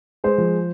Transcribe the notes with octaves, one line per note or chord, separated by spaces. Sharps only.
G#3 C5
F3